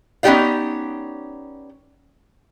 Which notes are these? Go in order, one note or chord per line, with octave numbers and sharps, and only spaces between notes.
B3 C#4 D#4 G4 D5 F5